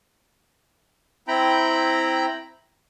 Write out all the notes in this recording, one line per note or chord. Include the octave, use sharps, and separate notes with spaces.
C4 E4 G5 A#5 B5